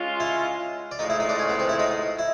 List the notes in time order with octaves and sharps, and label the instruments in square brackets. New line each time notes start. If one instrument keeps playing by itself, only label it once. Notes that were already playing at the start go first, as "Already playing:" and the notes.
Already playing: [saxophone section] G#3 C#4 F4
[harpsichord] E4 E5
D5
[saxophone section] A2 F3 G#3 [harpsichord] D#4 D#5
[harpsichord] E4 E5
D#4 D#5
D4 D5
C#4 C#5
B3 B4
C4 C5
E4 E5
D#4 D#5
E4 E5